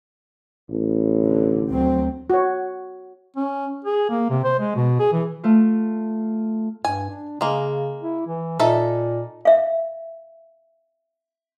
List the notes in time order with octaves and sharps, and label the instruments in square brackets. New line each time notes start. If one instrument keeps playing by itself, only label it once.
[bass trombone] A1
[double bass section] D3
D2 F#3 C4
[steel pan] F#4 C#5
[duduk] C#4
G#4
A#3
C3
C5
G#3
B2
G#4
E3
[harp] A3 F4
[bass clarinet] G2 [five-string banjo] G#5
[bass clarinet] D4
[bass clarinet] C#3 [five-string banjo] G#3 A#3
[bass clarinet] E4
E3
[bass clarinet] A#2 [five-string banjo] D#4 A4 E5
[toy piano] E5 F5